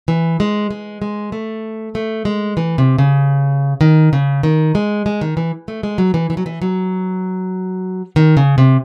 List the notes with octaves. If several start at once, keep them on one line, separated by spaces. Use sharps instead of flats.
E3
G#3
G#3
G#3
A3
A3
G#3
E3
C3
C#3
D#3
C#3
D#3
G#3
G#3
D#3
E3
A3
G#3
F#3
E3
E3
F#3
E3
F#3
D#3
C#3
C3